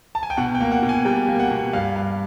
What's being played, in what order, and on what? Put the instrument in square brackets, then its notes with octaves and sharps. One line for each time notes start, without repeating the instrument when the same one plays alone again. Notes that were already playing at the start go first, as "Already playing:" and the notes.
[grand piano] A5
G#5
G5
B2 F#5
G5
A#3
F#5
B2
G#5
G3 G5
A#3
F#5
B2
G2 F5
G2